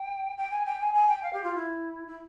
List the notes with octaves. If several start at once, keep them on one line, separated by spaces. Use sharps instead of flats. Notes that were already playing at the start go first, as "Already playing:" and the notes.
Already playing: G5
G5
G#5
G5
G#5
G#5
G5
F5
G4
F4
E4
E4